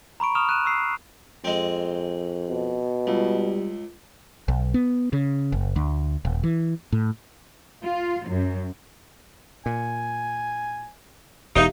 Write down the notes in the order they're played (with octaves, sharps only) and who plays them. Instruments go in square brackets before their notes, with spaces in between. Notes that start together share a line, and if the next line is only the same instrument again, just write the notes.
[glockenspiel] A#5 B5 C#6 D7
C#6 D#6 F6 E7 F7
F#6 D#7 E7
C#6 E6 C7
[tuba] F2 [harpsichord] G#3 C4
[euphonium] B2
[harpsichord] C#2 [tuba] G3
[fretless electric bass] B1
B3
C#3
F#1
D2
D#1
E3
A2
[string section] F4
F#2
[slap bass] A#2 [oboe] G#5
[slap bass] E1 E2 [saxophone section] D#4 [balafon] G4 E5 F5